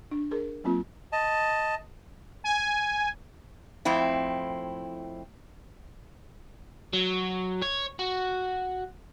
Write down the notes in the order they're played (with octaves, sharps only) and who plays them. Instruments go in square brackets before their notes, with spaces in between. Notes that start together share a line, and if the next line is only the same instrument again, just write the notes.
[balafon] D4
G#4 A#4
F#3 A#3 C4 F4
[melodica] D#5 A5
[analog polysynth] G#5
[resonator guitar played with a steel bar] F2 A2 C4 E4
[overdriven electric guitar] F#3
C#5
F#4